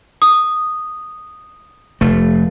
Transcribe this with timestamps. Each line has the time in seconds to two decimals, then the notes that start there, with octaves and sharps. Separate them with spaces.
0.22 D#6
2.01 F1 A3